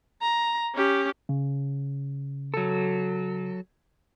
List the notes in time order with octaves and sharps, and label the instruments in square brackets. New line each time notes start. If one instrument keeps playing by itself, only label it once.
[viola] A#5
C#4 G4
[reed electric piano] C#3
[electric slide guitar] F#3 A4